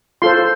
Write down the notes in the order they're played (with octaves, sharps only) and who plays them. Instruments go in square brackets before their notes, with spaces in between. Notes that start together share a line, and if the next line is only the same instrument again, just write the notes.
[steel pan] F4 A4 C5 C6